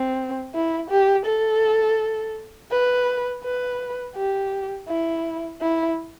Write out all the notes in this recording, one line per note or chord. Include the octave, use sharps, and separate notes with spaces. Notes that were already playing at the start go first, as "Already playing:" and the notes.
Already playing: C4
E4
G4
A4
B4
B4
G4
E4
E4